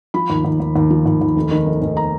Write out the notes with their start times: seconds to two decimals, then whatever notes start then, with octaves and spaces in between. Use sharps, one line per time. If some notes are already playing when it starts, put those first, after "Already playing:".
0.14 F3 B5
0.30 D#2
0.45 D#2
0.60 D#2
0.76 D#2
0.90 F3
1.06 D#2
1.21 D#2
1.36 F1
1.51 D#3
1.67 F1
1.82 F1
1.97 A#5